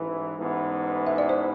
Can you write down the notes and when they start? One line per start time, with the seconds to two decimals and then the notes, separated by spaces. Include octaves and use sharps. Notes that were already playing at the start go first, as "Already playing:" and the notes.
Already playing: A1 G#2 E3
0.36 A1 G#2 E3 B3
1.07 E5
1.18 D5
1.29 C5